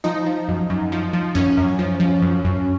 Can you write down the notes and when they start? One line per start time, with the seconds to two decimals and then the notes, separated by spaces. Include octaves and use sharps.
0.04 F3 D#4
0.26 F3
0.48 F#2
0.70 F#2
0.92 F3
1.13 F3
1.35 F#2 C#4
1.57 F#2
1.79 F3
2.00 F3
2.22 F#2
2.44 F#2